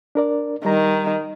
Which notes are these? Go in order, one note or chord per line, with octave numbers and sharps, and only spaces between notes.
D4 A#4 D5
D#3 G3 A#5